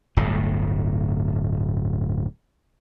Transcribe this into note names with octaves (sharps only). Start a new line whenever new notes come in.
D1 G1 A2